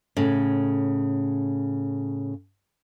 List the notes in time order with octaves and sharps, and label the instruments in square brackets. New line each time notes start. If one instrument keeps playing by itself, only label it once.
[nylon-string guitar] A2 C#3